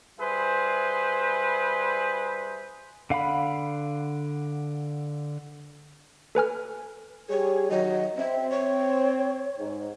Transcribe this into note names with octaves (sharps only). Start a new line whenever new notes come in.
G3 E4 G#4 B4 C5
D3 F5 F#5 B5
A4 B4 G#5 F6
G3 G4 G#4 C#5
D#3 F#3 D#5
C4 E5
C#5
G#2